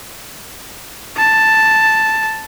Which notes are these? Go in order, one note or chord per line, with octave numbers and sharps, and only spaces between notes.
A5